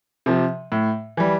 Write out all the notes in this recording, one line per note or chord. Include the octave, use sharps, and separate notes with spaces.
C3 F3
A2
E3 G3